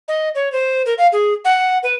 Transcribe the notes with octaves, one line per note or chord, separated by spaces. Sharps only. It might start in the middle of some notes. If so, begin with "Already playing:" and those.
D#5
C#5
C5
A#4
F5
G#4
F#5
B4